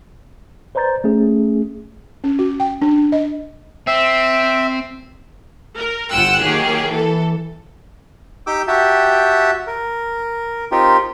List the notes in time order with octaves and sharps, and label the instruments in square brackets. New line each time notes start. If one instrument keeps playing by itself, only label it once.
[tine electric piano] B4 C5 D5 A#5 G6 A6
A3 C#4 G#4
[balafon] C#4
F#4
G5
D4
D#5
[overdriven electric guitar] C4 [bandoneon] E5
[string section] A#4
G1 F4 F#5 G5 E6 F#6
D#3 F#3 A#3 G4 G#4
E3 A4
[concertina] D#4 G4 G5 D6 E6
F#4 G4 E5 G5 A5
A#4
C4 D#4 F4 G4 A#4